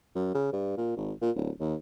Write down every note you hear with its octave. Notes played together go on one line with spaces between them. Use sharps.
F#2
C#3
G2
A#2
G#1
A#2
D1
D#2